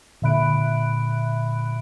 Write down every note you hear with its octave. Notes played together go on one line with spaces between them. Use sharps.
A#2 D3 E5 B5 F#6 D7